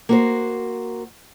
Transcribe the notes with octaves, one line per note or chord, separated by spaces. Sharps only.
A#3 F#4 C5